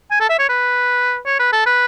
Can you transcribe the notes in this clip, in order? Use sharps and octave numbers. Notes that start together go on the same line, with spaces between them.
G#5
A4
E5
C#5
B4
C#5
B4
A4
B4